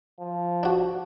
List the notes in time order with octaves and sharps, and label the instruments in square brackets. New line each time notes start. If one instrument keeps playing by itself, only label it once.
[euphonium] F3
[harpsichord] D4 F#4